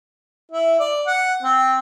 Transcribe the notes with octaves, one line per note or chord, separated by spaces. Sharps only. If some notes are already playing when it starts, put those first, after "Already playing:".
E4
D5
F#5
C4